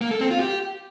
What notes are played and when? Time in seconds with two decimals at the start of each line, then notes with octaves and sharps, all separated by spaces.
0.01 A#3
0.11 A4
0.21 C4
0.30 F4
0.40 G4